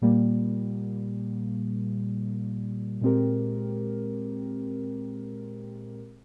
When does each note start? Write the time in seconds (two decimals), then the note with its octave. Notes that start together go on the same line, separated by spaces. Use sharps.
0.02 A#2 G3 A#3
3.01 A#2 G#3 C4 G4 A#4